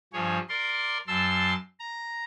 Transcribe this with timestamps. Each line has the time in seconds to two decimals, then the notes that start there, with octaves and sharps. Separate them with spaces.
0.13 G2 F3 G#4 C#5
0.49 A#4 D5 C6
1.08 F#2 A5 C6 E6
1.80 A#5